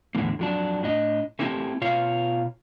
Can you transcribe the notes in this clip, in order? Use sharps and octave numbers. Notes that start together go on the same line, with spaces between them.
E2 A2 D3 E3 A#3
F2 F#3 D4
A2 D4 D#5
A3 A#3 C4 E4 G4 A4
B2 F4 C#5 F5